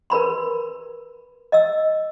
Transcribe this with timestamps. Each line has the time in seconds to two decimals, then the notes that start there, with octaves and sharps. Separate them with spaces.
0.10 A#4 B4 B5 C6
1.52 D#5 E6